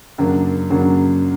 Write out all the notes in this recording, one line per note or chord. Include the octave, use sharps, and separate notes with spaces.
F#2 C#3 F#3 A#3 D4
F#2 C#3 F#3 A#3 D4